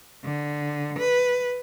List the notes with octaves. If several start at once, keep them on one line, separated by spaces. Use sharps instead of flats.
D3
B4